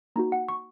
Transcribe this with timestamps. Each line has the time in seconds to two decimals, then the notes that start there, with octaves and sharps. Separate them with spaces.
0.16 A#3 D#4 F#4 A#5
0.32 F#5
0.48 C#6